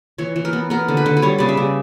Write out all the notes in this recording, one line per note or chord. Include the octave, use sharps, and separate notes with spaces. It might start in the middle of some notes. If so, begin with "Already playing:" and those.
E3 C#5
E3
A#4
B3
B3 A#4
D3
B4
D3
B4
G3 C#5
C#3 D5
E5
C#3